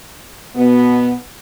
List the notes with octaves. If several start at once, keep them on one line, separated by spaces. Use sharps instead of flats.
B2 B3